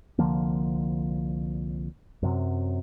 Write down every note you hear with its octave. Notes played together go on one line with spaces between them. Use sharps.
C2 D3 F3 A#3
F#2 C3 F#3